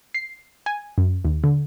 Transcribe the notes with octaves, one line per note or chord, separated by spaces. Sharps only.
C7
G#5
F#2
D#2
D3